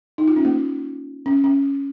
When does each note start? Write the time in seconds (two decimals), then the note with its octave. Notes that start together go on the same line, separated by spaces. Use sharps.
0.18 D#4
0.28 F4
0.36 C#4
0.45 A#3
1.26 C#4
1.44 C#4